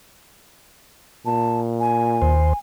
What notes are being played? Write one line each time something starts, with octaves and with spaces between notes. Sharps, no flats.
A#2 A5
G#5
D#2 C5